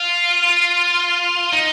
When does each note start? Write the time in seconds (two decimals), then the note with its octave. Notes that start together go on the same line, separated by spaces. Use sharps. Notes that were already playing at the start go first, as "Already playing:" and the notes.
Already playing: F4
1.53 D#4